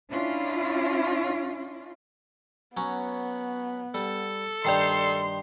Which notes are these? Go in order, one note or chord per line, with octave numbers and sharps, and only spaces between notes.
C#4 D4 E4 F4
F#3 B3 C#4
G3 A4
G2 D#3 D5 G5 C6 C7